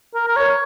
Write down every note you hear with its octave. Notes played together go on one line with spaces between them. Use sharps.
A#4
A#4
C#5